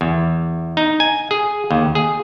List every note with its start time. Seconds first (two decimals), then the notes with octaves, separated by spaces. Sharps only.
0.01 E2
0.77 D#4
1.00 G#5
1.31 G#4
1.71 D#2
1.95 G#4